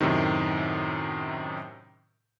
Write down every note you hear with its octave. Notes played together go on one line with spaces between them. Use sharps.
F#2 A2 C3 D#3